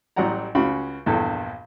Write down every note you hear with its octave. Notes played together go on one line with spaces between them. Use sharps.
A1 F#3 G3 F#5 A#5
C#2 C#3 F#4 B5
A#1 E2 G2 A4